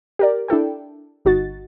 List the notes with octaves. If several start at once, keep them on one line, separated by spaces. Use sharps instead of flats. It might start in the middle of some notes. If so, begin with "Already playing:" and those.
G4 A#4 D5
D4 E4 A4 G5
G1 D#4 F#4 A6